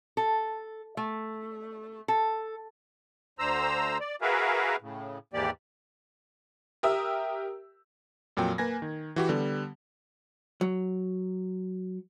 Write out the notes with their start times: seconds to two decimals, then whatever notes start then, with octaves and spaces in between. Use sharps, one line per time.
0.17 A4
0.97 A3
2.08 A4
3.39 D2 D3 C5 A#5 E6
4.00 D5
4.21 F#4 G#4 A#4 B4 E5 F5
4.82 A2 C#3
5.33 D#2 G#2 E3 A#3 G4 D5
6.83 G4 A#4 E5 D#6 E6
8.37 F2 A#2 F#3 G5
8.58 A#3 B4 G#5 G#6 A#6
8.82 D#3
9.16 E3 F#4 G4
9.29 D3 G3 B3
10.61 F#3